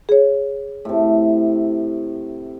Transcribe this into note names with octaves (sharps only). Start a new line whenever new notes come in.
G#4 C#5
A2 C3